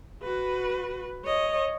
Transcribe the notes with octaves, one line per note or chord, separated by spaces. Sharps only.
F#4 B4
C#5 D#5